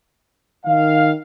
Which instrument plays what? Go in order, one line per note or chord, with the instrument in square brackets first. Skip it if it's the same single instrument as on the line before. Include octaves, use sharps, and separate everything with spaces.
[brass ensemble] D#3 F5